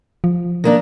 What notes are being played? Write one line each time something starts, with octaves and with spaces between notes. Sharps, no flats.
F3
D#3 A#3 D4